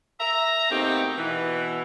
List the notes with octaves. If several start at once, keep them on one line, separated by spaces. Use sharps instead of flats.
E5 A#5
B2 A3 A#3 C4 D#4 G4
B2 E3